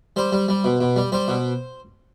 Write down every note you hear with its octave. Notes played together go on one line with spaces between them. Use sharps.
G3 C5
G3
G3
B2
B2
G3
G3 C5
B2